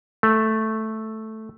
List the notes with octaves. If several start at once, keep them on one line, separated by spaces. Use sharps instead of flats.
A3